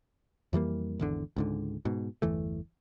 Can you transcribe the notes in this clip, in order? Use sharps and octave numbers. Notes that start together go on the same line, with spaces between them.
F2 E3 G3 A#3
G#1 E2 D3
C#2 G#2 D3
G#2 B2
G1 E2 E3 A3